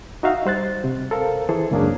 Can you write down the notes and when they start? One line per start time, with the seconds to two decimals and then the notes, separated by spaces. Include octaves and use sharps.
0.23 D#4 F#4 E5 F5
0.45 G3 C5 F#6 A6
0.84 C3
1.11 A4 A#4 C5 F5
1.49 E3 G#4 A4 C5
1.71 C#2 F#2 A#3 C#4 D4 G#4